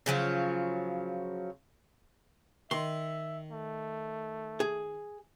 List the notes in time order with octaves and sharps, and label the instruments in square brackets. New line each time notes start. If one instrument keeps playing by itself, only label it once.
[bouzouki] C#3 F3 F#3 F4
[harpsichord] D#3 [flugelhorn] E5 [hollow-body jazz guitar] C6
[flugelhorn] A3
[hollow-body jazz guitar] G#4